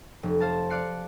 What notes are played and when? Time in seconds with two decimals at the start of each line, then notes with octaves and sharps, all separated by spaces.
0.23 F1
0.40 C5 F5 A5
0.70 D5 F5 F#6 C7 C#7